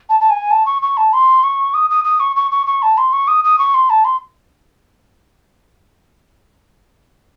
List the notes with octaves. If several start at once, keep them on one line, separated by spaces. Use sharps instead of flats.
A5
A5
G#5
A5
C#6
C#6
A5
C6
C#6
D#6
D#6
D#6
C#6
C#6
C#6
C#6
A5
C6
C#6
D#6
D#6
C#6
C6
A5
C6